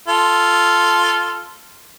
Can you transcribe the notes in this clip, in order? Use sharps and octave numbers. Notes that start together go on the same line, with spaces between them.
F4 A4